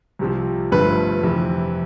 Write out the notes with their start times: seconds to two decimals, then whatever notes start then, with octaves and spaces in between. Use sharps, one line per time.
0.19 C2 C3 F3
0.71 G1 G2 F3 A3 B4
1.23 F2 C3 E3